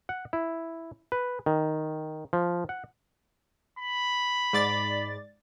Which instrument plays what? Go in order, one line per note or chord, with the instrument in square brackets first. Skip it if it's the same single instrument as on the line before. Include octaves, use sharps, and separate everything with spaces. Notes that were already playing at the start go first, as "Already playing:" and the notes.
[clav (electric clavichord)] F#5
E4
B4
D#3
F3
F#5
[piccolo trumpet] B5
[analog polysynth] G#2 D5 A6